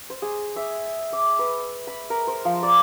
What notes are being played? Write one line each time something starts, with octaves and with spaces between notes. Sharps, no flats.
C5
G#4
E5
D6
B4
B5
A#4
C5
F3
D5